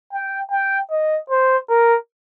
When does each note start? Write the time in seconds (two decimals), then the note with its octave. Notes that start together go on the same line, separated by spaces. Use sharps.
0.13 G5
0.51 G5
0.91 D#5
1.30 C5
1.69 A#4